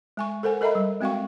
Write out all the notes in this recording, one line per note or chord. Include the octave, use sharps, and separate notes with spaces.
G#3 G#5 C#6
A4 A#4 C5 F#5 G#5
A4 A#4 D#5 E5 A#5 B5
G3
G#3 C4 F#4 F5 G5 C#6